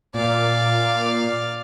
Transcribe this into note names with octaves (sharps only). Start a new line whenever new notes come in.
A#2 D5 F5